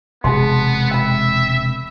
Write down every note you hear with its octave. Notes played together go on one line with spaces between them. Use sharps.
E1 C3 G#3 B3 G#4 A5 C6
E5 G5 B5